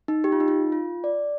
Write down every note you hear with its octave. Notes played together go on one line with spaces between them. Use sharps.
D#4
G4
F4
D#4
F4
F4
D5